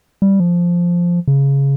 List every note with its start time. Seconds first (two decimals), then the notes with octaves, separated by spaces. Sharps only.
0.22 G3
0.40 F3
1.28 C#3